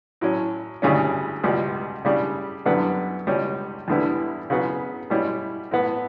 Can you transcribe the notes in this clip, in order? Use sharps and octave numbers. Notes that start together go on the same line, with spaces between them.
A2 F#3 C#4
D2 C#3 G3 C#4
C#2 B2 G3
C#3 G3 D4
F#2 D3 G3 B3 D4
C#2 B2 G3 C#4
E2 D3 G3 B3 E4
C#3 F#3 B3
B2 G3 C#4 E4
A2 E3 B3